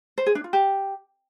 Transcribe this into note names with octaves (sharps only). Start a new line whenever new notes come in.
C5
G#4
D4
F4
G4